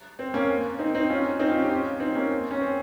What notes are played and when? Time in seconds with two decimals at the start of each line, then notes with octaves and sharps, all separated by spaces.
0.19 C4
0.34 A#3 C#4
0.79 C4 D#4
0.94 C4 D#4
1.10 C#4 F4
1.39 C4 D#4
1.50 C#4 F4
1.62 G4
1.70 C#4 F4
2.00 C4 D#4
2.15 A#3 C#4
2.51 C#4
2.61 C4